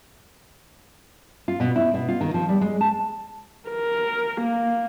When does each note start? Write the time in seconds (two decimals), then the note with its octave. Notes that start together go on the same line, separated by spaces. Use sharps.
1.48 F4
1.60 B2
1.76 E4
1.94 B2
2.09 F4
2.21 D#3
2.34 F3
2.49 G3
2.61 G#3
2.81 A5
3.69 A#4
4.41 A#3